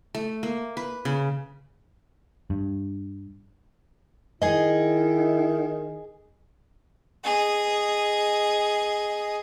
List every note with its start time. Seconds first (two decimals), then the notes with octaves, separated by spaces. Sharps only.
0.15 A3
0.43 A#3
0.77 B4
1.05 C#3
2.50 G2
4.42 D#3 E4 G#4 D#5
7.24 G#4 D#5